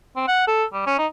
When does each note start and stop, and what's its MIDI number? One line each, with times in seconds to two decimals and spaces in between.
0.16 0.24 60
0.28 0.46 78
0.48 0.64 69
0.74 0.87 55
0.87 0.95 61
0.99 1.07 63